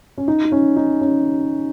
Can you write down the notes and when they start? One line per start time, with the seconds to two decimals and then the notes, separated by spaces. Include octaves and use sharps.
0.18 C#4
0.28 D#4
0.45 D#4
0.52 C#4
0.76 D#4
1.01 C#4